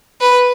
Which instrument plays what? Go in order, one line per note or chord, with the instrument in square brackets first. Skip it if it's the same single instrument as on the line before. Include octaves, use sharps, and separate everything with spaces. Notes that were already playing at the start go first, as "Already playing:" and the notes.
[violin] B4